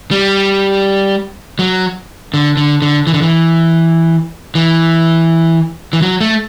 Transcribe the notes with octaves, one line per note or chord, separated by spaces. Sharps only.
G3
F#3
D3
D3
D3
E3
D3
E3
E3
E3
F#3
A3